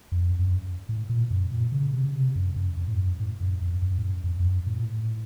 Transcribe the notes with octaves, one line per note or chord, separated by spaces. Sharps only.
F2
F#2
A2
A#2
F#2
A#2
C#3
C3
C#3
C3
F#2
F#2
F2
A2
F#2
A2
F#2
F2
F#2
A2
F#2
F2
F2
F#2
A2
A#2
A2